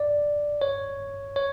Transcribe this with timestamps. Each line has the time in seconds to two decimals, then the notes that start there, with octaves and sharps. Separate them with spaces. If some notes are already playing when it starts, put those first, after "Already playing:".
Already playing: D5
0.62 C#5
1.36 C#5